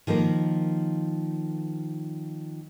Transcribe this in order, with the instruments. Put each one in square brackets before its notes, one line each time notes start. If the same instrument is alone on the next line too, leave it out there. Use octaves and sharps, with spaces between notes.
[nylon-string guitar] D#3 F3 A#3 A#4